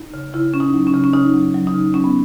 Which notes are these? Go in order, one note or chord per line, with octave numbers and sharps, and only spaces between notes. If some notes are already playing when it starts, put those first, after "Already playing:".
Already playing: D#4
C#3
C#3 E4
C#3 C#4
D#4
F#3
C#4
C#3
C#4
C#3 D#4
F#3
F#3
D#4
C#3
F#3 C#4
B3